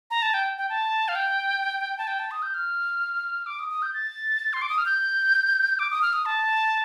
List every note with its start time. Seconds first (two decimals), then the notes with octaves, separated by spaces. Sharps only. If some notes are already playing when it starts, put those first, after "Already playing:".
0.11 A#5
0.22 A5
0.34 G5
0.58 G5
0.69 A5
1.08 F5
1.15 G5
1.98 A5
2.07 G5
2.19 A5
2.31 D#6
2.42 G6
2.54 F6
3.46 D6
3.59 D#6
3.70 D#6
3.82 G6
3.94 A6
4.53 C6
4.62 D6
4.69 D#6
4.78 F6
4.86 G6
5.79 D6
5.91 D#6
6.02 F6
6.13 D#6
6.26 A5